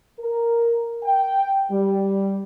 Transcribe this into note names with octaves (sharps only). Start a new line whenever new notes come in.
A#4
G5
G3